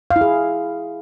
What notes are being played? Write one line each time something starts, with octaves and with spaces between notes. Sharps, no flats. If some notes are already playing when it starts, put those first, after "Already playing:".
F5
E4
G#4